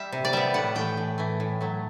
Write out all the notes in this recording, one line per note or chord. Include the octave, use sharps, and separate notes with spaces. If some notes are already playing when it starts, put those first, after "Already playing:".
Already playing: G3 E5
C3
D5
G3 B3 E5
A2 F#5
E3 A3 G5
A2
E3 A3
A2
F#3 A3